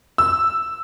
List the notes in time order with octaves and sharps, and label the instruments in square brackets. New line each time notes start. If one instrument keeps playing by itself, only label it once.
[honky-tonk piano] E6